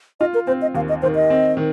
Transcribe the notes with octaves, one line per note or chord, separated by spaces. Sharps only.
F4 D#5
A#4
C4 C5
D#5
D#2 F5
D#5
D#3 C5
D#5
C4
D#3